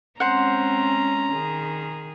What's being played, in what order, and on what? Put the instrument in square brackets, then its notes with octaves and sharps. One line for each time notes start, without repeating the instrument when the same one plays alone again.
[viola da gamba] G#3 C4 C#4 [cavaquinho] C5 F#5 [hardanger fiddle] A#5
[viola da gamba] D#3 G#4